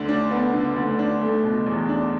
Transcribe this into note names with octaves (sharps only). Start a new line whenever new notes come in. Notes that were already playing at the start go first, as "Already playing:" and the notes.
Already playing: D2 D3
D4
B3
D3
D2
D4
A3
B2
E2
D4